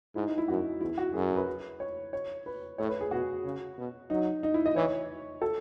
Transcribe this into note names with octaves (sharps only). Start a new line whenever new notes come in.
G#2 E4
D#4
E4
F#2 F#4
E2 E4
F#4
F#2 G#4
B4
C#5
C#5
B4
A2 C#5
B4
G#4
B2 F#4
C#3
B2
F#3 D#4
D#4
E4
D#5
E3 C#5
A4